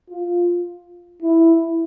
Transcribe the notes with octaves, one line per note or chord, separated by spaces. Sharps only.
F4
E4